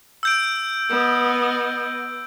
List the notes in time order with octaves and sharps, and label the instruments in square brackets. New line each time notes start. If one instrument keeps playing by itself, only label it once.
[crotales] E6 G6 D7
[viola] B3 D#5